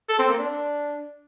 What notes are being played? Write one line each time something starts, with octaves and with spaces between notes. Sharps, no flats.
A4
C4
A#3
D4